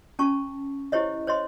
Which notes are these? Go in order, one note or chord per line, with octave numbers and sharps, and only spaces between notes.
C#4 A5 C#6
E4 G4 C5 C#5 D#5
C5 C#5 D#5 C6